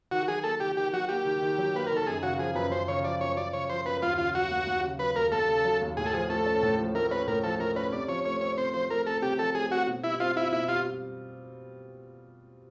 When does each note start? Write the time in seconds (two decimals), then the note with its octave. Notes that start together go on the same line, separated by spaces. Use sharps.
0.11 D#3 F#4
0.28 F#3 G#4
0.44 A#3 A4
0.60 D#3 G4
0.77 D#3 G4
0.93 F#3 F#4
1.09 A#3 G4
1.25 D#3
1.42 D#3
1.58 F#3
1.75 A#3 B4
1.87 D#3 A#4
1.97 A4
2.07 F#2 G#4
2.23 C#3 F#4
2.39 F3 G#4
2.55 F#2 B4
2.72 F#2 C5
2.88 C#3 C#5
3.04 F3 D5
3.21 F#2 C#5
3.37 F#2 D5
3.53 C#3 C#5
3.69 F3 C5
3.86 F#2 B4
4.02 D#2 F4
4.18 C#3 F4
4.34 F#3 F#4
4.51 D#2
4.67 D#2
4.83 C#3
4.99 F#3 B4
5.16 D#2 A#4
5.32 D#2 A4
5.48 C#3
5.65 F#3
5.81 D#2
5.97 A2 G#4
6.06 A4
6.13 F3 G#4
6.29 A3 A4
6.46 C#4
6.63 A2
6.78 F3
6.95 A3 A#4
7.11 C#4 B4
7.27 A2 A#4
7.43 F3 A4
7.60 A3 A#4
7.76 C#4 B4
7.92 C3 D5
8.08 F3 C#5
8.25 A3 C#5
8.41 C4 C#5
8.57 C3 C5
8.74 F3 C5
8.90 A3 A#4
9.06 C4 A4
9.22 C3 G4
9.38 F3 A4
9.55 A3 G#4
9.71 C4 F#4
9.87 B2
10.04 G3 E4
10.20 C4 F4
10.36 E4 F4
10.53 B2 E4
10.68 G3 F4